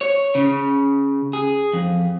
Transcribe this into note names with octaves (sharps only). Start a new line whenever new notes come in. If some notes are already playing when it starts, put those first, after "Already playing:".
C#5
C#3
G#4
F2